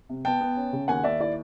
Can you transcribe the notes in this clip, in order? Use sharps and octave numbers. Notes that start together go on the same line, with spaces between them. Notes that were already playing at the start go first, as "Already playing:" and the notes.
C3
B3 G5 A5
B3
C#4
C#3
D#2 F#5 G#5
D#2 D5 E5
E4 D5